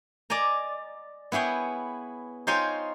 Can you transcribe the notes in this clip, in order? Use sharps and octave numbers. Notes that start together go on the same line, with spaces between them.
D5 D#5 G#5 A#5
B3 E4 G#4 C#5 G5
D#4 F4 C5 C#5 G5 G#5